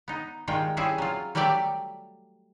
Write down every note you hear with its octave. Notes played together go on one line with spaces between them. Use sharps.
B3 D#4
D#3 G3 G#3 F4 G5
G3 C4 C#4 E4 G#4
F#3 F4
F#3 G3 A3 G4 D5 E5